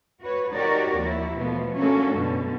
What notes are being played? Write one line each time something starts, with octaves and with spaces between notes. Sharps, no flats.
F#4 B4 C#5
D#4 F#4 G4 A#4 C#5 D5
D#2 F3 E4
B2 E3 F3 A3 B3
A3 A#3 C#4 D4 F#4 A4
F#2 B2 D3